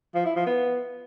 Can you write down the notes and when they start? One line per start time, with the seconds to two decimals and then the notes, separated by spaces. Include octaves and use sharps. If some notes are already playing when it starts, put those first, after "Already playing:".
0.15 F3
0.25 E4
0.36 F3
0.47 B3